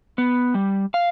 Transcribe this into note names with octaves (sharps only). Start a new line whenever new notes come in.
B3
G3
F5